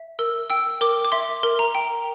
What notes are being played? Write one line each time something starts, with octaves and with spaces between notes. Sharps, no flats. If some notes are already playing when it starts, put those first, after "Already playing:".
Already playing: E5
A#4 E6
G5 E6
A#4 D6
D6
E5 C6
A#4
A#5
G5